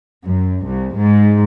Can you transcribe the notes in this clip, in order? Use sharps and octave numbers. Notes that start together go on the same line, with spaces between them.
F#2
C2
G#2